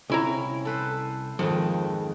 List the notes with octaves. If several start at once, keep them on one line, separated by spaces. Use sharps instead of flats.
C2 C#4 E4 A#5
A4 B4 C5
F2 G#2 D#3 F3